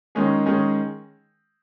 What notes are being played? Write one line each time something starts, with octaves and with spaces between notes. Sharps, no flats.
D#3 G#3 C#4 G#4
D#3 G#3 C#4 G#4